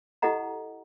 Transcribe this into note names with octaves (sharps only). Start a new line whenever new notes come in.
E4 G4 A4 D#5 F#5 A#5